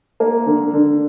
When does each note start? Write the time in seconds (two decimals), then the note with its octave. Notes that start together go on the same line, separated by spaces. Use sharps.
0.20 A#3
0.46 D3
0.73 D3